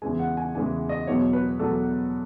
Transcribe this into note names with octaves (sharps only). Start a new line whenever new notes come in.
E2 C#3 E3 G#3 G#5
F#5
G#5
E2 C#3 E3 G#3 G#5
D#5
E2 B2 F#3 C#5
B4
E2 B2 F#3 A4